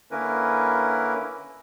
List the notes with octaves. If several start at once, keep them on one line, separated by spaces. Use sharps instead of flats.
D3 A#3 C#4 E4 A#4 B4